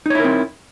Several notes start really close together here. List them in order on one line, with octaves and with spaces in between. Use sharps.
D#4 C#5 E4 A#4 C4